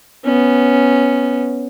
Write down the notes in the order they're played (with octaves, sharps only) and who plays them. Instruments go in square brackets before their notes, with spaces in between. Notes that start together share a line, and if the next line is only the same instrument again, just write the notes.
[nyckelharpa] B3 C#4